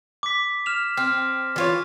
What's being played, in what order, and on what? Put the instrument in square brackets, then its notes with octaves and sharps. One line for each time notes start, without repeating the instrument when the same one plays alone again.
[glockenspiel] D6 B6
F6 E7 F7
[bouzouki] C4 [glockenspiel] F6
[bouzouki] E3 F4 C#5